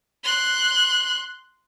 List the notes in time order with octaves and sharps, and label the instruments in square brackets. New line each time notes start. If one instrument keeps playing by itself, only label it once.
[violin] C6 F#6